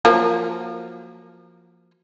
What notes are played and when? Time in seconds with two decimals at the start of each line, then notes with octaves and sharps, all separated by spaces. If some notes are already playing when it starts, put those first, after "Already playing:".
0.05 F3 F#3 A#3